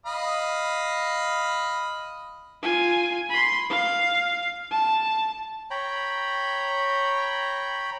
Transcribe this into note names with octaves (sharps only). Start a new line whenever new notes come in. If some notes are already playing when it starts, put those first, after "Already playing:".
D#5 F5 B5
F4 G#5
B5 C6
F5
A5
C#5 G5 A#5 B5